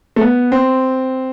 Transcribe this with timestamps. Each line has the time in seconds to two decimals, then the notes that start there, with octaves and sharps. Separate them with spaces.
0.16 A3
0.21 B3
0.52 C4